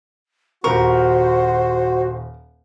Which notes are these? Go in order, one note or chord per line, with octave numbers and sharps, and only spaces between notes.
D#1 F#4 A#4 C5 C#6